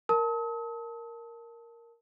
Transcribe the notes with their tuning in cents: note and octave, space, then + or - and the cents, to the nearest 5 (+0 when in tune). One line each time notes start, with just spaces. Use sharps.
A#4 +0 A5 +0 D#6 +45